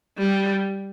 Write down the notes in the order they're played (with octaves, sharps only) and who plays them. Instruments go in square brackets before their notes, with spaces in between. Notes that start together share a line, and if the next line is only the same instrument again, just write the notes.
[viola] G3